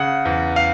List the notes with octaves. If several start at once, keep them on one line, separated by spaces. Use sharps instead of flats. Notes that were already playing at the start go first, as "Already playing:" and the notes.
Already playing: C#3 F#5
E2
F5